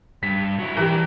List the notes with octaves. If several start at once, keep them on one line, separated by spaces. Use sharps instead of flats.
G2 B6
F#3 E4
E3 D4 G4 A#4